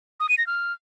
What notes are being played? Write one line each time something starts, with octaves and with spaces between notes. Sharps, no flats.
D#6
D#7
A#6
F6